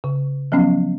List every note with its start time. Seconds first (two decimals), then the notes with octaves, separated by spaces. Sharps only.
0.04 C#3
0.52 F3 F#3 B3 C#4